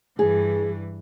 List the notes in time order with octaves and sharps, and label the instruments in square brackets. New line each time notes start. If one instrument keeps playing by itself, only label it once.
[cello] G2 E3 [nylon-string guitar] G#4